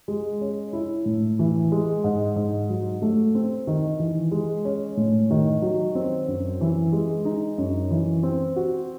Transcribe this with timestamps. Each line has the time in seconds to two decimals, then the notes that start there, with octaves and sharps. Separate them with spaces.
0.08 G#3
0.41 C#4
0.73 E4
1.05 A2
1.39 E3
1.72 G#3
2.04 G#2
2.36 G#2
2.69 F#3
3.02 A3
3.35 C4
3.67 D#3
3.99 E3
4.32 G#3
4.65 C#4
4.97 A2
5.31 D#3
5.62 F#3
5.95 C4
6.28 F#2
6.61 E3
6.93 G#3
7.25 D#4
7.58 F#2
7.91 E3
8.23 C4
8.56 F#4